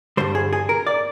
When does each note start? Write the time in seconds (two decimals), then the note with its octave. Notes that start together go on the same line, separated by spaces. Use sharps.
0.17 G2 D3 G3 C5
0.35 G#4
0.53 G#4
0.69 A#4
0.87 D5